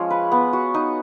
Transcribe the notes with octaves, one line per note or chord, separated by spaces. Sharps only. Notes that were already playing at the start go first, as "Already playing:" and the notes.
Already playing: F3 G#3 C#4
B4
B3
F#4
D#4